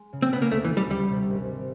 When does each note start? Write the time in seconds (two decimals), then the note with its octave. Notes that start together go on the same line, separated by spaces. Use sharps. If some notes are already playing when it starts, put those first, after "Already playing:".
Already playing: G#3
0.13 C#3
0.22 C4
0.33 C#3 B3
0.42 A#3
0.51 D2 A3
0.65 E3
0.70 D2
0.77 G3
0.90 D2 G3
1.10 C3
1.29 G#1
1.47 G3